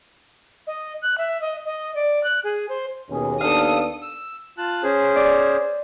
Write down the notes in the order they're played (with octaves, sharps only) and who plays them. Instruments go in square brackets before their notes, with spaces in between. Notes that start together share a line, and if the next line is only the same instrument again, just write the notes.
[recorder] D#5
F#6
E5
D#5
D#5
D5
F#6
G#4
C5
[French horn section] D#2 [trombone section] B2 C#4 G#4
[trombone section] B3 D4 [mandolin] A4 F5 [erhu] D#6
[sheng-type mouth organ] E6
F4 A5 F#6
C#4 G#4 C5
[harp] D5